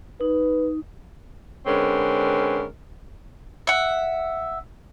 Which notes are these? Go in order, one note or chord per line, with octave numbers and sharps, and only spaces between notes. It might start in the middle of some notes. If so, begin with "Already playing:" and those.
D#4 B4
D3 G#3 C4 C#4 A#4 B4
E5 F#5